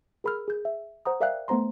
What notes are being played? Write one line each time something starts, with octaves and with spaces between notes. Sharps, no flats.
G#4 A#4 B5 E6 F6
G#4 G6
E5
C5 F#5 A#5 D#6
A#4 D5 E5 F5 G5 F#6
A3 B3 C5 A#5 C6